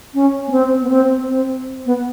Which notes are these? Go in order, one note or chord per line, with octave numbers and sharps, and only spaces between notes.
C#4
B3
C4
B3
C4
C4
B3